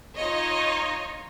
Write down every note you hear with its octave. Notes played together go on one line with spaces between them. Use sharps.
D#4 F4 C#5 D#5